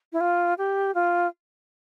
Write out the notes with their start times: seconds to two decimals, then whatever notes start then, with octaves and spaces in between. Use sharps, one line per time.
0.13 E4
0.21 F4
0.58 G4
0.95 F4